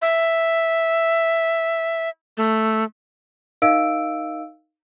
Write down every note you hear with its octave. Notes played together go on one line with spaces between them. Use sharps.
E5
A3
D#4 A#4 D#5 F5 E6 D7